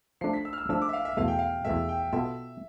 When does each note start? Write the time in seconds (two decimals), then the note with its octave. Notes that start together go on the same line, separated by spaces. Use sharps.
0.21 F3 A3 D4 C7
0.33 B6
0.45 E6
0.53 F6
0.58 E6
0.69 F3 A3 D4 E6
0.82 D6
0.89 E5
0.93 F5
1.05 E5
1.17 E2 B2 A3 F5
1.28 G5
1.39 F5
1.65 E2 B2 A3 E5
1.89 G5
2.12 B2 B3 F4 A4 E5